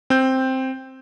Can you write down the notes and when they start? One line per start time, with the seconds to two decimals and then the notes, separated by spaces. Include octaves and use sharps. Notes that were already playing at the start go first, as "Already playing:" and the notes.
0.10 C4 G6